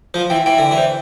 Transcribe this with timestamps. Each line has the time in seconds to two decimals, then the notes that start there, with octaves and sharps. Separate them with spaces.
0.14 F3 C5
0.30 E3 G5
0.46 E3 G5
0.58 D3 G5
0.71 E3
0.78 C5